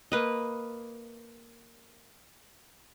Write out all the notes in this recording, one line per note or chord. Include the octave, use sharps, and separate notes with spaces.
A#3 B4 D#5